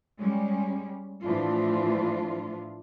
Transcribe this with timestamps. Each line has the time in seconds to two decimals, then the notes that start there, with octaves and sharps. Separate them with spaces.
0.18 G3 G#3 C#4
1.23 A2 E3 F3 A3 D4 F4